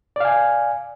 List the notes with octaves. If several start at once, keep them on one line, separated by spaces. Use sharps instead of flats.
D5 F5 G#5